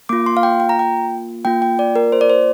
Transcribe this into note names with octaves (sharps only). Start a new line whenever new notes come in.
A#3 F4 D6
C6
F5
G5
G5
A#5
G5
A#3 F4 G5
G5
D5
A#4
C5
D5
C5